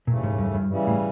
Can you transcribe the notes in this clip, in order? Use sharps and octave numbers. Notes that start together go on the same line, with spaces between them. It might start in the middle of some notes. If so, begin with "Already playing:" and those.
D#2 A#2 C#3 E3 A3
G#2
G2
G2
C#3 E3 G3
A2